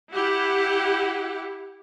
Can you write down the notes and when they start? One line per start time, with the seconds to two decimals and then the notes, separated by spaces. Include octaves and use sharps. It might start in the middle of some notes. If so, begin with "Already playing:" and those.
0.11 E4 G4 F#5